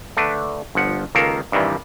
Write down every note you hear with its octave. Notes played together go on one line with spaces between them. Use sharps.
D3 A3 D4 B4
G1 F3 F#5
C#2 D#3 A#3 A4 A#4 F5
G2 C3 D#3 E3 G3